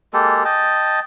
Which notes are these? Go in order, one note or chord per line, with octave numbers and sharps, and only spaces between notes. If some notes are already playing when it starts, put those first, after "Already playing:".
G#3 A#3 G4 A4
D#5 G5 A5